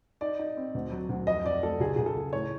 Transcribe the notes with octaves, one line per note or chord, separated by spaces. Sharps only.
D#4 D5
D#4
C4
D2
F#3
D2
F2 D#5
F2 D5
A3 A4
C#2 G#4
C#2 G#4
A4
C#2
A2 C#5